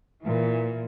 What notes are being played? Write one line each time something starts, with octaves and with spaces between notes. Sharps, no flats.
A#2 E3